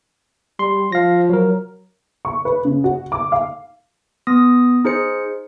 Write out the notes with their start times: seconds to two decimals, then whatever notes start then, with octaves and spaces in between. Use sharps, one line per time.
0.59 G3 C6
0.92 F3 F5 A#6
1.30 F#3 A#4
2.25 C#6
2.45 B4
2.65 C#3
2.84 F#4
3.12 D6
3.32 F5
4.27 B3 D#6 A#6
4.85 D#4 G#4 C5 C#7